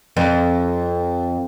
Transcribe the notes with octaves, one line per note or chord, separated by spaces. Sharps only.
F2